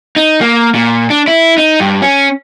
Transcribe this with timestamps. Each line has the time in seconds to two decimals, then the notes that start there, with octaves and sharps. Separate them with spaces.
0.16 D#4
0.41 A#3
0.75 A#2
1.10 D4
1.28 E4
1.58 D#4
1.80 G2
2.02 C#4